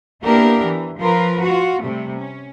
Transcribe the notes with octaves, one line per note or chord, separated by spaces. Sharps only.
A#3 B3 D4 E4 G4 A#4
E3
F3 F4 A#4 B4
F4 F#4
C3 G3 A3
C#4